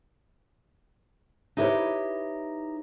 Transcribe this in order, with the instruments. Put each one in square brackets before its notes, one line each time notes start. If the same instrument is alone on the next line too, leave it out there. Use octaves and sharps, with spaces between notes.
[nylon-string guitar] D#4 E4 G4 A4 B4 C#5